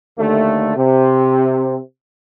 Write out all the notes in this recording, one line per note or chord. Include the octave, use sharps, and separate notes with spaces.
D#2 D3 A3
C3